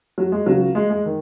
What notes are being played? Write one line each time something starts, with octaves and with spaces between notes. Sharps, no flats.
F#3
G#3
C#2 C#3 F#3
G#3
G#3
D#3